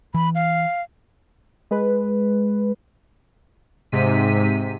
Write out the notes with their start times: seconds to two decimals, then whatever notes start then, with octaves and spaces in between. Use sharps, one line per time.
0.14 E3 B5
0.35 F5
1.71 G#3 B4
3.92 G#2 C3 B6 D#7